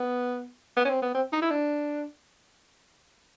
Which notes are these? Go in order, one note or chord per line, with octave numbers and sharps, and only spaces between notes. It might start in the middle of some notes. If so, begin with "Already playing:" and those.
Already playing: B3
B3
C#4
C4
B3
C4
D#4
E4
D4